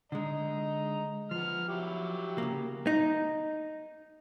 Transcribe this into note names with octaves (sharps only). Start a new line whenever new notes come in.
D3 G#3 D#5 A#5
F3 B3 F6
F#3 E4 G4
C#3 A#3
D#4